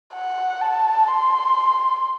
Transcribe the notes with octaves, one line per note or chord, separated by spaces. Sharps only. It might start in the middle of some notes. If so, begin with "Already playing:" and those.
F#5
A5
C6